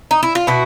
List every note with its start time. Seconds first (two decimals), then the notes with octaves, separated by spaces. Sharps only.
0.11 D#4
0.23 E4
0.35 F4
0.47 B2 E4 F#4